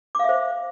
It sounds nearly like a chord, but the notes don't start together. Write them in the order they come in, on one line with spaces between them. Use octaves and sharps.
D6 F5 E5 C5